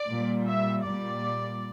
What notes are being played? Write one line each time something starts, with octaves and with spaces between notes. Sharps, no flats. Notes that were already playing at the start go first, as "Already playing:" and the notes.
Already playing: D5
A#2 G3
E5
A#2 G3 D5